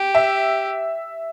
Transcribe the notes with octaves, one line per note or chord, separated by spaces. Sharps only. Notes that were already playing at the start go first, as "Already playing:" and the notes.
Already playing: G4
E5